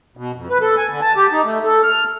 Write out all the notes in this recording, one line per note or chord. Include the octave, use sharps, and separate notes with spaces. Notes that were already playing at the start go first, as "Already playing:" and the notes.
B2
F2
B4
A4
G#5
D3
A5
G4
D#4
A3
A4
F6